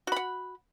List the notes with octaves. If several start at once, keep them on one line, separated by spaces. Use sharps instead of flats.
F#4 F#5 B5